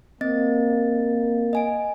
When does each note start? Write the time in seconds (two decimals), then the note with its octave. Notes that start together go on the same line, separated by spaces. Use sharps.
0.21 A#3 C4 D#5 A6
1.53 D#5 G#5 D7